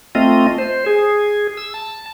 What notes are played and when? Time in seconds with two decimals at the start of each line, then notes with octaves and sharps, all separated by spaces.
0.15 A3 C4 F4 D#5
0.58 C5
0.86 G#4
1.57 E6
1.74 A5